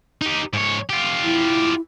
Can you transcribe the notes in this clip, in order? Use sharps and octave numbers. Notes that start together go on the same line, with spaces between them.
D#4 G4
G#2 C#5
F4 G4
E4